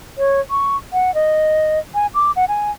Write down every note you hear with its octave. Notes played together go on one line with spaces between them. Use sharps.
C#5
C#6
F#5
D#5
G#5
D6
F#5
G#5